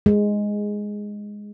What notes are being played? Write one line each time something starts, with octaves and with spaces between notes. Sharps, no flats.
G#3